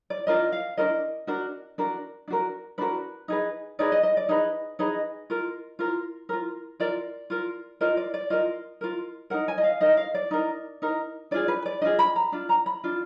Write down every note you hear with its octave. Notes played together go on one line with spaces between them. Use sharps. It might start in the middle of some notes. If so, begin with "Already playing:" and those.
D5
D4 F4 A#4 D#5
F5
D4 F4 A#4 D#5
D4 F#4 A#4
D4 F#4 A#4
D4 F#4 A#4
D4 F#4 A#4 B4
D#4 G#4 B4
D#4 G#4 B4 D5
D#5
D#5
D5
D#4 G#4 B4 D#5
D#4 G#4 B4 D#5
F4 A#4
F4 A#4
F4 A#4
F4 A#4 D5
F4 A#4
F4 A#4 D#5
D5
D5
F4 A#4 D#5
F4 A#4
D#4 A#4 F#5
G#5
D#5
F5
D#4 A#4 D#5
F5
D5
D#4 A#4
D#4 A#4
D4 F4 G#4 D5
B4
D5
D4 F4 G#4 D#5
B5
A#5
D4 F4
A#5
B5
D4 F4